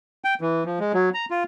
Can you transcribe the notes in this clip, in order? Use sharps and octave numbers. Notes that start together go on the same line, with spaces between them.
G5
E3
F3
G#3
F#3
A#5
F4